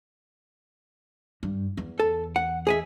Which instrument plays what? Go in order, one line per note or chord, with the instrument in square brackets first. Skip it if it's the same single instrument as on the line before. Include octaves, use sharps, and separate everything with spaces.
[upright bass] G2
E2
[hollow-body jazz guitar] A4
F#5
G#4 D#5 E5